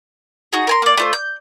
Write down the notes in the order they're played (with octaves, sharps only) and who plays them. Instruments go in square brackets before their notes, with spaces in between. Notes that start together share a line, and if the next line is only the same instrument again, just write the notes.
[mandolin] D#4 F#4 G#4
A#4 G#5 C6
A#3 D5
A3 F4 C5
G6